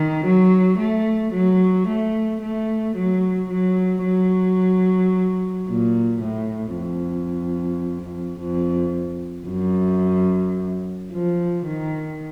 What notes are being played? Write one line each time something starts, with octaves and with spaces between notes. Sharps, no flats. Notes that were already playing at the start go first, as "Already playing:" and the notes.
Already playing: D#3
F#3
A3
F#3
A3
A3
F#3
F#3
F#3
A#2
A2
F2
F2
F#2
F3
D#3